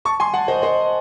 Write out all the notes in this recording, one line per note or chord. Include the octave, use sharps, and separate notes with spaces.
A5 C#6
G#5 C6
F#5 A5
C5 D#5
C5 D#5